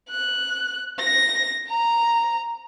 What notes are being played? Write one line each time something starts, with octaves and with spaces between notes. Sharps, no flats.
F#6
A#6
A#5